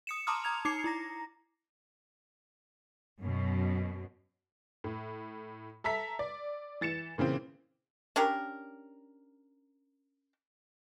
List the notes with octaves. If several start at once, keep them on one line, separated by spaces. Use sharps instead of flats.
D#6 C#7 E7
A5 A#5 C6 D6 D#6 F6
A#5 G#6 F7
D#4 D6 G#6 C7 C#7
E4 A#5 A#6
F#2 B2
A2
A4 E5 A#5 B6
D5
E3 A6 C#7 E7
A#2 C#3 E3 C4
C#4 D4 G4 A#4